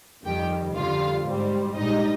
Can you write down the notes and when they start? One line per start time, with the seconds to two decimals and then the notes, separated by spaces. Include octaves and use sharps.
0.25 F2 D#3 G3 G4 G5
0.75 F2 D3 G3 F4 F5
1.26 G#2 G3 C4
1.75 A#1 G#2 G3 D#4 D#5